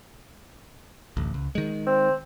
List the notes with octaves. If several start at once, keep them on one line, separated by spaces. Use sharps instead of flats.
A1 D2
C#2
D#3 G#3
C4